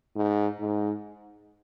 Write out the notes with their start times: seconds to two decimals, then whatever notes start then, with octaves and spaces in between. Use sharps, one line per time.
0.16 G#2
0.61 G#2